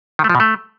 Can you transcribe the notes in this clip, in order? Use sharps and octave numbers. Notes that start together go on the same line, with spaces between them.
D#3
A3
F3
B2
A3